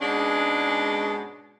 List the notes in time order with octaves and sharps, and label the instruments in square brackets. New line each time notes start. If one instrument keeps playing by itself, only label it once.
[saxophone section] G#2 B2 G#3 C#4 D4